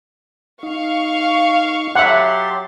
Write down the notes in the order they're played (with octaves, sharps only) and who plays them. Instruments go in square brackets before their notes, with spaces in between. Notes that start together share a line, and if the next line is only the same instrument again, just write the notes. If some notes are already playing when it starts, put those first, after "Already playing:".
[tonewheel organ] D#4 [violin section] F5 C#6
[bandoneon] F#3 G4 C6 [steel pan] E5 F#5 [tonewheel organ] A5